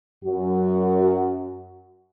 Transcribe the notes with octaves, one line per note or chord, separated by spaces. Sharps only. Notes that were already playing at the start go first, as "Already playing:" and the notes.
F#2 F#4